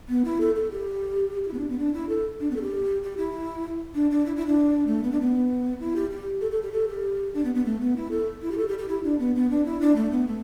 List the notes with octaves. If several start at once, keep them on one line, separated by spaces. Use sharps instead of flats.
B3
E4
A4
A4
G4
G4
E4
B3
D4
B3
D4
E4
A4
D4
B3
A4
G4
G4
E4
D4
D4
E4
E4
D4
A3
B3
D4
B3
E4
G4
G4
A4
A4
G4
A4
G4
D4
B3
B3
A3
B3
E4
A4
E4
G4
A4
G4
G4
E4
D4
B3
B3
D4
E4
D4
A3
B3
A3